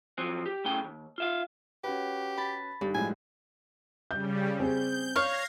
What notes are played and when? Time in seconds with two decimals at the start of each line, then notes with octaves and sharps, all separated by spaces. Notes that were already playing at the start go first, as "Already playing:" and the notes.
0.18 F3 F#3 C4
0.46 G4
0.64 B1 A2 C#3 G5
0.84 D#2
1.18 F4 E5 F5
1.84 C#4 F#4 G4 B4
2.37 A5 B5
2.81 G1 G2 D#3
2.95 A2 F3 G#3 G#5
4.11 C#3 G3 G6
4.60 C4 G#4 G6
5.16 C#5 F5 F6 G#6 A#6 C7